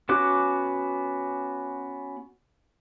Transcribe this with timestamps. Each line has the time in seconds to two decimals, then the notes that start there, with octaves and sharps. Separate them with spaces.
0.09 B3 C#4 F#4 D6 F#6